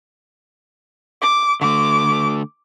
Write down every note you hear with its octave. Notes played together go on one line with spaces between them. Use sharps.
D6
D3 A3 D6